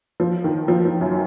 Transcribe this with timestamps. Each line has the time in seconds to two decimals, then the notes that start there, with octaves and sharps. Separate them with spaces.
0.20 F3
0.44 D#3
0.68 F3
0.85 F3
1.01 F#2 F#3